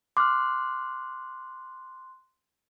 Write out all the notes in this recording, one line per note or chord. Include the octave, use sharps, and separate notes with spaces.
C6 D6 F6 F#6